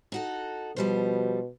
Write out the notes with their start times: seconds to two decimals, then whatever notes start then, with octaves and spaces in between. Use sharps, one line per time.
0.12 D#4 F#4 A4
0.76 B2 F3 G3 C5